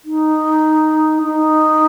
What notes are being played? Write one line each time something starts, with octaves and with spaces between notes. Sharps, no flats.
D#4
D#4